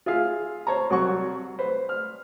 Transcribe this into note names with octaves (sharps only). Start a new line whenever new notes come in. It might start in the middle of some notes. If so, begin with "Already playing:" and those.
F4 G#4 E5 F5
C5 C#5 A5 A#5
C2 F#3 F#4 C#6
B4 C5
F6